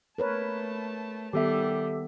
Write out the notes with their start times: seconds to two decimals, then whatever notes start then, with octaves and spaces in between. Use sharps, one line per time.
0.18 A3 A#4 B4 C#5 A5
1.33 D#3 G3 B3 G4 A4 E5